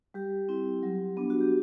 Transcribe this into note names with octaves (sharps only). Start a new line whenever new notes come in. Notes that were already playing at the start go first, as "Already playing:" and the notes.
G3 G4
C4 E4
F#3
B3 D4
F#4
G4